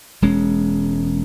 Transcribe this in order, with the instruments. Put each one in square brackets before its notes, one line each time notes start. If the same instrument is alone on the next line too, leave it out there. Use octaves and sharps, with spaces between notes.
[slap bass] E1 G#3 C#4